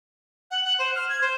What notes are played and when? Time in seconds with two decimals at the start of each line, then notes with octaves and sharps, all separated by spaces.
0.51 F#5
0.64 F#5
0.79 C5
0.95 F6
1.09 G#6
1.21 C5